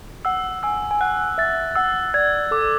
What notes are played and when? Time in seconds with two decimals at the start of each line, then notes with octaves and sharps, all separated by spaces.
0.25 F#5 E6
0.63 G#5 E6
0.91 G#5
1.01 F#5 F#6
1.38 E5 A6
1.76 F#5 E6
2.14 D5 G#6
2.51 A4 D6